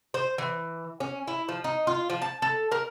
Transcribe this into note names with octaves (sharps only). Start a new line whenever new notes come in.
C5
E3
C#4
E4
F3
D#4
F4
F3
A5
A4
A#4